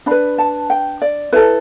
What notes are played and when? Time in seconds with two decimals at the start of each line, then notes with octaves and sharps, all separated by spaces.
0.06 D4 B4 B5
0.38 A5
0.70 G5
1.02 D5
1.32 E4 A4 B4